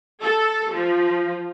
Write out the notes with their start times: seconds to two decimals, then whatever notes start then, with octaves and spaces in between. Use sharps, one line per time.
0.24 A4
0.74 F3